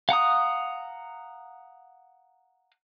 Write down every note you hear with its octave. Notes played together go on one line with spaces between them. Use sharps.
F5 F#5 A#5 D#6